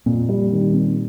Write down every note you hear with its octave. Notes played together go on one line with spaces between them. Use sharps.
F2 A#2
G3
D#3
C4